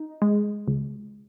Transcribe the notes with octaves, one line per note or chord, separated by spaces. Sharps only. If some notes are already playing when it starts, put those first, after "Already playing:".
Already playing: D#4
G#3
C#2